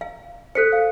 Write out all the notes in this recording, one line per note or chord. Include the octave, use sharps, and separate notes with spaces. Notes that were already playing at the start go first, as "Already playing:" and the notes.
F5
A4 C5 F#6 B6 C#7
F5